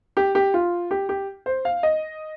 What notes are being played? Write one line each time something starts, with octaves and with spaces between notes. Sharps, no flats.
G4
G4
F4
G4
G4
C5
F5
D#5